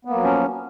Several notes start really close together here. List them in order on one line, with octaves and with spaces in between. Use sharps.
B3 A#3 F#3 F3 C#4